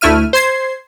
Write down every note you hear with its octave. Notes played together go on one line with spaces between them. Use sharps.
D2 A3 E4 E5 F6 D#7
C5 C6 G#6 C7